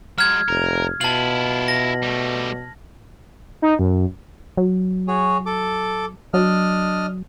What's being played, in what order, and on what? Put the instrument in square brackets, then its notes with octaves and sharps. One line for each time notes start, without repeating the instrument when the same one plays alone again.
[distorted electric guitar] F#3 G#3 [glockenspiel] F6 G#6
[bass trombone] F1 [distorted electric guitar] A#4
[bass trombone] B2 [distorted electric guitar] E4 F4 [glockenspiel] A5 F#7
[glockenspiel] A#6
[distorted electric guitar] G3 A3
[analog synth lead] D#4
F#2
[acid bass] F#3
[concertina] F#4 G#4 C#5
A4 D6
[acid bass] F#3 [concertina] D4 D#5 F6